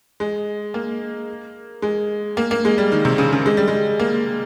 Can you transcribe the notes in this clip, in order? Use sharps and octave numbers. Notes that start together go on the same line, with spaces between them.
G#3
A#3
G#3
A#3
A#3
G#3
G3
D#3
C3
C#3
C#3
G#3
G3
G#3
A#3